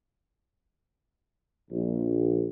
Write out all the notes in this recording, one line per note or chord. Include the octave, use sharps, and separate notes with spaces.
A#1